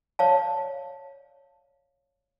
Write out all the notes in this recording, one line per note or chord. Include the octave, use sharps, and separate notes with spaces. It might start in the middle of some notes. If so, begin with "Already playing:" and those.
C#5 D5 F5 A5